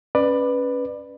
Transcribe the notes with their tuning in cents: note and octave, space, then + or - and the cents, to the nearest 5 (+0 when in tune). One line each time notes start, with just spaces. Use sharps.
C#4 +0 B4 +0 D5 +20